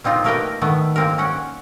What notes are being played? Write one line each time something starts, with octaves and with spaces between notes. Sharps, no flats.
A#3 C4 D#4 F4
A3 A#3 A#4 B4 D#5 G5
D#3 A3 B3
A#3 C4 A#4
C#4 F#5 G5